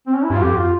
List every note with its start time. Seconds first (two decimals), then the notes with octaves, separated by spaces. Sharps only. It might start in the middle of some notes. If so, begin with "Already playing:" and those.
0.07 C4
0.15 C#4
0.24 E4
0.30 G2 F4
0.41 F2 G4
0.57 F4